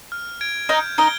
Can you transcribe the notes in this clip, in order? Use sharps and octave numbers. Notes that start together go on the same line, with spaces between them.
F6
G#6 D7
D#4 D#5 G6
D#4 D#5 D7 G7